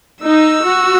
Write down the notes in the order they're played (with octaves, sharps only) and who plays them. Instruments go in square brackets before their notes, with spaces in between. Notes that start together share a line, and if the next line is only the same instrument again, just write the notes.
[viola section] D#4 [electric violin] E6
[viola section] F#4